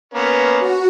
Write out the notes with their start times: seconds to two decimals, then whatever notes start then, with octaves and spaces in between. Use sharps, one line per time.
0.14 A#3 B3 C#4
0.59 F#4